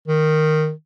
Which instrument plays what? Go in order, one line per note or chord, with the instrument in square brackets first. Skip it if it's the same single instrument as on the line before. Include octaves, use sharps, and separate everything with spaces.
[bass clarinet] D#3